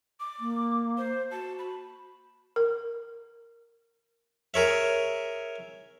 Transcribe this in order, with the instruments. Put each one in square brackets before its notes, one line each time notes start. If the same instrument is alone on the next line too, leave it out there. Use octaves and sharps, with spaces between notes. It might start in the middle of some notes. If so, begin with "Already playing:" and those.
[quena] D6
[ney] A#3
[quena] C5
[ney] F#4 [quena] A5
[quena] B5
[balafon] A#4
[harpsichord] G#4 A#4 C#5 E5